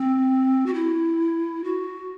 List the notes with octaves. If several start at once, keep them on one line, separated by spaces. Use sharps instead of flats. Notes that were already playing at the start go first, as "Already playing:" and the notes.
Already playing: C4
F#4
E4
F#4